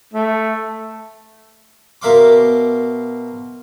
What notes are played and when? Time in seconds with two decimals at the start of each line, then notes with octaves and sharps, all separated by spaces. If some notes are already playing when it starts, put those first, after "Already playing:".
0.13 A3
2.02 B2 A#4 E5 F5 C6 D6